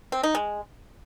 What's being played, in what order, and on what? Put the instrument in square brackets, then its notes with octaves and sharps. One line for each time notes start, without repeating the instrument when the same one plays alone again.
[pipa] C4
D#4
G#3